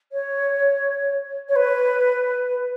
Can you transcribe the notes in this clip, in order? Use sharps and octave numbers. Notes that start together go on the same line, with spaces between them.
C#5
C#5
B4